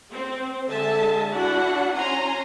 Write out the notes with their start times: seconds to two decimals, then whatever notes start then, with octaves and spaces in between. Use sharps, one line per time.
0.12 C4
0.69 D3 G#3 A4 E5 G#5 A5
1.30 D4 E4 F#4 F#5
1.93 C#4 G#5 A#5 C6